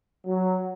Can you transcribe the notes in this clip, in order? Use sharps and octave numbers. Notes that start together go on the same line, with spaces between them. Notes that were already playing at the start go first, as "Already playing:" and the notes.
F#3